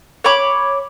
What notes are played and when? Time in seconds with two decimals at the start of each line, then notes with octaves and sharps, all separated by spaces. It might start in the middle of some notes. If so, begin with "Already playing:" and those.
0.24 C#5 B5 D6